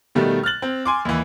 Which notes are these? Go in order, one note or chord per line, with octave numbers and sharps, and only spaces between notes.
B2 D#3 G3 A3
F6 F#6 A6 F#7
C4
G#5 C6 D6
D#2 E3